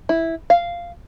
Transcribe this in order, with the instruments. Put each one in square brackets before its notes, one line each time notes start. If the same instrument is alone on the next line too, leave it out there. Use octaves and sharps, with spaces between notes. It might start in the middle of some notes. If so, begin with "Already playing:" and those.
[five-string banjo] E4
F5